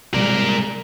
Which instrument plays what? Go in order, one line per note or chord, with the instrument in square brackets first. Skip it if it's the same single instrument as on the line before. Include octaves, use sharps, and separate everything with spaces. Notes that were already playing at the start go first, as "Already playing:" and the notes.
[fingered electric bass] C3 G3 G#3 [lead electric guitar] A#4 D5